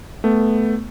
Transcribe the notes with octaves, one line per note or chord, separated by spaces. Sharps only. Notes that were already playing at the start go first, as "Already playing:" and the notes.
A3 B3